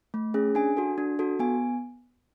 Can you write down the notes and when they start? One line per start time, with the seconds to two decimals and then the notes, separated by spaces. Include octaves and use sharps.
0.14 A3
0.34 C#4 G#4
0.55 D4 G#5
0.77 F#4 A4
0.98 D4
1.19 F#4 A4
1.39 B3 G#5